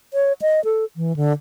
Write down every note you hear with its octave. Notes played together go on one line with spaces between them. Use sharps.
C#5
D#5
A4
E3
D3